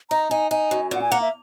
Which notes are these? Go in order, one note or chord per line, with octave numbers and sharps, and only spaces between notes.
D#4 A#5
D#4 G#5
D#4 G#5
F#2
A#2 F#5
G#5
A#3 F#5
E5